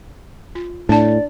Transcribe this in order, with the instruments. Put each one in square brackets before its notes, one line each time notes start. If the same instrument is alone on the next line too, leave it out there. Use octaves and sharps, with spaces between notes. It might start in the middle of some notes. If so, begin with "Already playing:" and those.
[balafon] F4
[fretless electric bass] A2 [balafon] D4 A5 [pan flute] D5